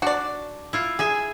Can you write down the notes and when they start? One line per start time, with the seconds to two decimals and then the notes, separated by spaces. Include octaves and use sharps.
0.02 D4 F#4 D5
0.73 E4 F4
0.99 G#4 E5 G#5